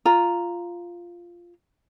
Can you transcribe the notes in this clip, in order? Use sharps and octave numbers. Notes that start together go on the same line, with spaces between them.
F4 A#5